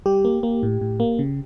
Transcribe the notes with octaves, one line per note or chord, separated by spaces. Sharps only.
G3 G4
A#3
A#3
A2
A2
A#3
C#3